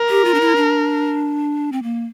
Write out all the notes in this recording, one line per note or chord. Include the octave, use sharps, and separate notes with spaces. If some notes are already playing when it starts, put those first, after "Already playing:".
Already playing: A#4
G4
F4
D4
E4
D4
C4
A#3